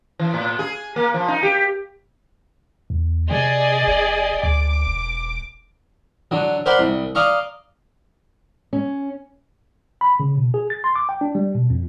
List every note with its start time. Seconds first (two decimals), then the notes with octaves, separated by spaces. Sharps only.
0.19 E3
0.34 A2
0.59 G#4
0.96 A#3
1.14 F3
1.28 D#4
1.43 G4
2.90 E2
3.31 C3 G#4 D5 D#5
3.87 F1
4.43 D2 D6
4.86 E1
6.31 D3 F#3
6.66 A#4 C5 D5 F#5 B5 C6
6.79 C2
7.15 D5 D#5 F5 A#5 C#6
8.73 C#4
10.01 B5
10.20 C#3
10.37 B2
10.54 G#4
10.70 A6
10.84 C6
10.96 D6
11.09 G5
11.21 D4
11.35 G3
11.55 B2
11.70 F2